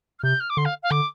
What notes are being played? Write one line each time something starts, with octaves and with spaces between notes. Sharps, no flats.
F6
C3 G6
F6
D6
D3 C6
F5
F5
D3 D6